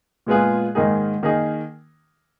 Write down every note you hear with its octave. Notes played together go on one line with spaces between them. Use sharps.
A#2 G#3 B3 F4 G#4
G#2 D#3 A#3 D#4 G#4
D#3 A#3 D#4 G#4